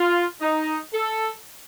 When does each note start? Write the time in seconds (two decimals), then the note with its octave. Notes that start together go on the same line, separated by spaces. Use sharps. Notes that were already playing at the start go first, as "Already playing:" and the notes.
Already playing: F4
0.40 D#4
0.93 A4